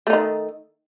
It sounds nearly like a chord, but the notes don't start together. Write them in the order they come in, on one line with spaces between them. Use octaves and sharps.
A3 D#4 D#3